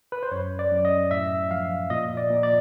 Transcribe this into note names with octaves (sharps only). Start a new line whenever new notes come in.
B4
C5
F#2 C#5
D5
F#2
D#5
A2 E5
F3 F5
A#2 D#5
D5
A#2
D5